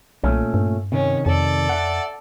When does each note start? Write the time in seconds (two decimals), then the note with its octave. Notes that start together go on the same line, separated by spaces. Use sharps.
0.24 B1 A#2 A3 C#4
0.54 G2
0.92 C3 D#3 C#4
1.26 F2 A4 D5
1.69 E5 F#5